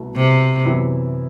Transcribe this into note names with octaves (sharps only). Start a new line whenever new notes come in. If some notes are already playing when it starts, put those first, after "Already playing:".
Already playing: C2 B2 A3
C3
F#2 E3 B3 E4 G4